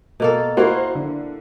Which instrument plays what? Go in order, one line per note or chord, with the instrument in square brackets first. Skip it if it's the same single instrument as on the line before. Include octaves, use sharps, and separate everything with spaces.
[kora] B2 A#3 A4
[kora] A#3 E4 [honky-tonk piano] F#4 C5
[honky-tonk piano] D3